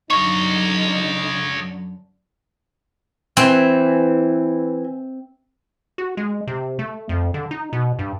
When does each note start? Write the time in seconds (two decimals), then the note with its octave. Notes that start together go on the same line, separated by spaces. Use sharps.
0.10 F#2 D3 F#3 D#4 C#5 D#5 C#6
3.37 E3 C4
5.98 F#4
6.17 G#3
6.47 C3
6.79 A3
7.09 F2
7.34 D3
7.51 D#4
7.73 B2
7.99 G2